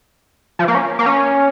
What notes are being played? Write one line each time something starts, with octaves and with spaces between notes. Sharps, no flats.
F3
A#3
C#4
A#3
C#4